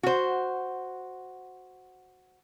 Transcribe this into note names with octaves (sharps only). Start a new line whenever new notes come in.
F#4 C5